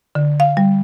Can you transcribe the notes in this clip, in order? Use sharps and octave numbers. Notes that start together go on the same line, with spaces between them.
D3
F5
G3